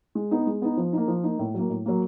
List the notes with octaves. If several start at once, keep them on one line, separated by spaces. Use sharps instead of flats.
G#3
B3 D#4
G#3
B3 D#4
F3
A#3 D#4
F3
A#3 D#4
A2
F#3 A#3
A2
F#3 A#3